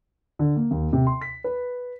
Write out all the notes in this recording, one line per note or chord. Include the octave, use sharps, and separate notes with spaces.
D3
A#3
D#2
C3
C6
B6
B4